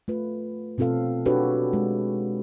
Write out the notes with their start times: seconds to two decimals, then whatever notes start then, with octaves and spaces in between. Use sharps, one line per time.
0.08 A3 F4 B4
0.78 B2 C4 F4 A4 F5
1.26 D4 F#4 G4 A4 B4 C#5
1.73 G#3